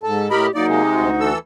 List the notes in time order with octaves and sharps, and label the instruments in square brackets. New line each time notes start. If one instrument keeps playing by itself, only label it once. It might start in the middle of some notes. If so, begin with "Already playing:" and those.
[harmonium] G#2 A4 A5
[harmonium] A2 D#5 [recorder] G4 [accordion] A#4 B5
[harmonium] F#3 A#3 [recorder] D#4 [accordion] D5
[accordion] C3 G#3
[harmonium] D2 F#4
[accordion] E3 A4 E6